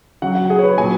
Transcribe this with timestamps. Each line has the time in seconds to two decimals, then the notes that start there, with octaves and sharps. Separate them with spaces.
0.22 C#3 F#3 F#5
0.35 F#5
0.50 G#4
0.59 C#5
0.64 B4
0.77 A#2 F#3 G#5